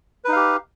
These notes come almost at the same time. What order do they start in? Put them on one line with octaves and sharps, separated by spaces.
B4 D#4 F5 G4